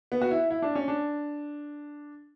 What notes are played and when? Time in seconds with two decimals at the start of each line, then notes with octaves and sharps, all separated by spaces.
0.12 B3
0.21 F#4
0.31 E4
0.51 E4
0.62 D4
0.75 C#4
0.88 D4